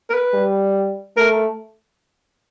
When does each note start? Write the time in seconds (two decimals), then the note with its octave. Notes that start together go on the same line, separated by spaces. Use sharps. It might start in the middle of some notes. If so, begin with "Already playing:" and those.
0.10 A#4
0.14 B4
0.34 G3
1.17 A3 A#4